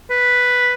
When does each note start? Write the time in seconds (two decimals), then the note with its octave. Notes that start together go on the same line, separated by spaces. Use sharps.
0.10 B4